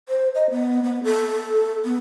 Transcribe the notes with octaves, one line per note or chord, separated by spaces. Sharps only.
C5
D#5
B3
B3
A4
B3